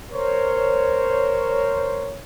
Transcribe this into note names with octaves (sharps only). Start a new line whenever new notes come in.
A#4 C5 C#5